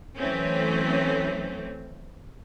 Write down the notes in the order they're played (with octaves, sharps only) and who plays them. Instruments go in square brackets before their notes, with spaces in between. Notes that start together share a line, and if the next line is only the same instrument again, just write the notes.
[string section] E3 F#3 A3 C4 C#4